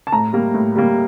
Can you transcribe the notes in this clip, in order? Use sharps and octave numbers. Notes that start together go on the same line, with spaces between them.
A5
A2 A#5
G3 A#3
A2
G3 A#3